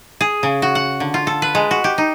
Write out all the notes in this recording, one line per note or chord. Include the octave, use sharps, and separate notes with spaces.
G#4
C#3
F#4
F#5
D3
F4
A4
B4
G#3
F#4
G4
D#4